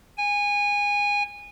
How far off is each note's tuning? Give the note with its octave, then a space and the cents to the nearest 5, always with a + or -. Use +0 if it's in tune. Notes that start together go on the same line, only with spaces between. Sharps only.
G#5 -20